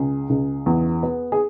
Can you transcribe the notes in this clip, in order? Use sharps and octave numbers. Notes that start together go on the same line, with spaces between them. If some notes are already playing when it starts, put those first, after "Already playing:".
Already playing: C#2 G#4
C#2
E2
B3
G#4